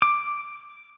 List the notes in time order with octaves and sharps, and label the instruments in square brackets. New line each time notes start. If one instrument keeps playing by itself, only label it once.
[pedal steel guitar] D6